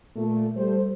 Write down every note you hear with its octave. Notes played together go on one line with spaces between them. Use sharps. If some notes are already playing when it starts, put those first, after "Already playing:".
A#2 A3
G3 A4 C5